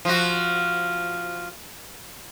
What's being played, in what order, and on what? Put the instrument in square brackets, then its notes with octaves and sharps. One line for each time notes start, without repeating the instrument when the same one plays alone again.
[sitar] F3 F#4